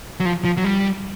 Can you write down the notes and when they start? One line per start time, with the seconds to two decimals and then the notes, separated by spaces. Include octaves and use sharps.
0.20 F#3
0.26 F3
0.45 F3
0.57 F#3
0.65 G3